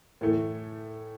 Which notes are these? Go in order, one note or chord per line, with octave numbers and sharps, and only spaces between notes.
A2 E3 A3